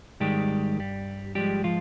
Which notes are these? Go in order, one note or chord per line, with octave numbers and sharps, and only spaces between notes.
G#2 D#3 G3 G#3 G4
G2 G3
G#2 F3 G3 G#3 G4
F3 F4